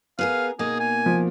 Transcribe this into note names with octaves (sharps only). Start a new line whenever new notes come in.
B3 G#4 A#4 F5
B2 A#3 D#4 G#4
G#5
F3